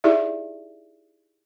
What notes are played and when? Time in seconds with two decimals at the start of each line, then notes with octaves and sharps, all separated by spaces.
0.04 D#4 E4 G4 G#4 D5 E5